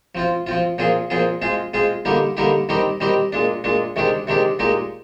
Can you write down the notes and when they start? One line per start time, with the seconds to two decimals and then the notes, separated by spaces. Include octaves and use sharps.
0.15 F3 C4 F4
0.47 F3 C4 F4
0.78 A#2 F3 C4 F4 G#4
1.10 A#2 F3 C4 F4 G#4
1.42 G#3 C4 F4 G#4
1.74 G#3 C4 F4 G#4
2.05 D3 G3 A#3 D#4 G4
2.37 D3 G3 A#3 D#4 G4
2.69 D#3 G3 C4 D#4 G4
3.00 D#3 G3 C4 D#4 G4
3.32 A#2 G#3 D4
3.64 A#2 G#3 D4
3.96 C3 D#3 G#3 D4 G4
4.27 C3 D#3 G#3 D4 G4
4.59 A#2 G#3 D#4 G4